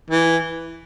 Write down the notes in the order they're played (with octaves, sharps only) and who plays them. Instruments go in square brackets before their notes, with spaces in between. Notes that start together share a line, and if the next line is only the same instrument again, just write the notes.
[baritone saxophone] E3